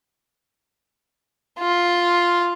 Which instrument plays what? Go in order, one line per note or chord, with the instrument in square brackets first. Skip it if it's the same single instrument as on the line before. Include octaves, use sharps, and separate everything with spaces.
[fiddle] F4